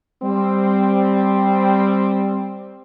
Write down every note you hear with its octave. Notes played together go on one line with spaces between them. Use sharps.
G3 C4